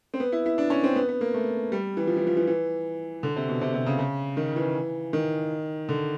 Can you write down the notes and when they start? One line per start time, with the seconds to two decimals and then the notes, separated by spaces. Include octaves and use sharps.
0.14 C4
0.20 B3
0.32 E4
0.46 E4
0.58 D4
0.70 C#4
0.83 C4
0.96 B3
1.09 B3
1.21 A#3
1.34 A3
1.72 G3
1.97 E3
2.07 F3
2.17 E3
2.27 F3
2.37 E3
2.47 E3
3.23 D3
3.36 C3
3.48 B2
3.61 C3
3.74 C3
3.86 C#3
3.99 C#3
4.37 D#3
4.56 E3
5.13 D#3
5.89 D3